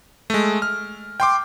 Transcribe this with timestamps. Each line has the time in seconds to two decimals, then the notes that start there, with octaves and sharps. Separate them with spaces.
0.30 G#3 A3
0.62 F6
1.20 G5 C6 D6